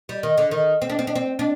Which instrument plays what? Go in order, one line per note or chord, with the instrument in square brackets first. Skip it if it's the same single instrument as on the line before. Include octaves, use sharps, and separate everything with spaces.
[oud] G3
D#3
D3
D#3
C4
D4
C4
D4
C4
D4